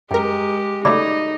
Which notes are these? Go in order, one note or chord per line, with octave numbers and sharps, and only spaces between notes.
F#2 G#3 G4 A#4 G5
C#3 F#3 A3 D#4 D5 B5 D6